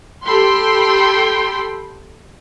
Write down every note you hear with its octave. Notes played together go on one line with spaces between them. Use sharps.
G4 A4 G5 B5 C6